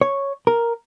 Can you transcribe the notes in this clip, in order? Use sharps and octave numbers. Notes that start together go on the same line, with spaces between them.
C#5
A#4